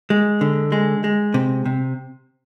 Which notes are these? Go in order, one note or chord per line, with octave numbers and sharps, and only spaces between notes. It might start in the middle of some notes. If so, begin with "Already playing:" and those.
G#3
D3
G#3
G#3
C3
C3